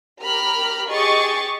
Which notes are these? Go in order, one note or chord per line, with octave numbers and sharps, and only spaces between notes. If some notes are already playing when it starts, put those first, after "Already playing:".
G4 A#4 A#5 B5 F6
G4 G#4 D#5 C#6 A6